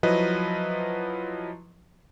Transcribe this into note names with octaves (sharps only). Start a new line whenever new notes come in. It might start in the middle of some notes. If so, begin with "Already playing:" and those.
F3 F#3 E4 B4 D#5